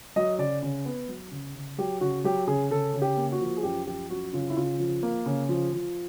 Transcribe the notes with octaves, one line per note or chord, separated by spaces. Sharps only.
F#3 D#5
C#3 D5
C#3
B3
F#3
C#3
C#3
F#3 G4
C#3 F#4
F#3 G4
C#3 G#4
C#3 A4
C#3
G4
A#3
F#4
F3
G#4
F#2 G4
F3 G4
F#2 F#4
C#3 F4
E4
C#3 F4
F3
A#3
C#3
F3
F3